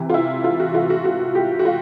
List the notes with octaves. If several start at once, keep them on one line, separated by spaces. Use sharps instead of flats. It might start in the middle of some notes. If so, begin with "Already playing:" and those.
Already playing: C3 E3
F4
E4
F4
F#4
F4
F#4
F#4
G4
F#4
F4